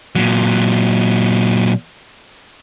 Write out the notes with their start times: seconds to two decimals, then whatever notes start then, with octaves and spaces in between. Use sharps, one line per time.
0.16 A#2 F#3